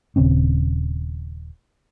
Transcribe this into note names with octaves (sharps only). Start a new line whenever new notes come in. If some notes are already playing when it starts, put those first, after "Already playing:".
D#1 C#3 C4 C#4